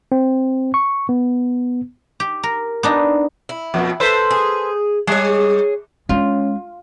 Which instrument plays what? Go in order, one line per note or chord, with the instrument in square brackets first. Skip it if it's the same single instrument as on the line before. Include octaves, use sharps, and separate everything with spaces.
[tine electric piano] C4
C#6
B3
[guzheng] G4
A#4
B3 D4 D#4
[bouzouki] E4
[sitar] F2 B2 B3
A4 B4 C5
[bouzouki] G#4
[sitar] G3 [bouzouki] G#4 C#5
[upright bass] G#3 [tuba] C#4 [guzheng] F4